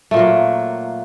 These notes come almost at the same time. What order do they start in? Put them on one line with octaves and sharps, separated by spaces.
A3 A#2 A#3 F#3